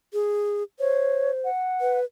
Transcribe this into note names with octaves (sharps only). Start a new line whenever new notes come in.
G#4
C5 C#5
F#5
B4